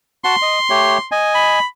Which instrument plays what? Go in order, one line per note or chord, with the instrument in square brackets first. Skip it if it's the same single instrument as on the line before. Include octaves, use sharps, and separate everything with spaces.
[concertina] F#4 F#5 A5 [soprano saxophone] C6
[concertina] D#5
A3 G4 C#5
D#5 G#5
[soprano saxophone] B5